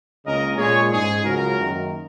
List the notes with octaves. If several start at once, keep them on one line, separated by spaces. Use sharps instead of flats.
C#2 C#3 A#3 C#4 A#4 D#5
A#2 G#3 C#4 G#4 C#5
G#2 G#3 C#4 D#4 G#4
C#2 C#3 F#3 F#4 A#4
F#2 D#3 A#3